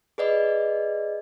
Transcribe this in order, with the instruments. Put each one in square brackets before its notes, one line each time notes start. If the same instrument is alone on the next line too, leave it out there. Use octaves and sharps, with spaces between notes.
[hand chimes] G#4 B4 D5 D#5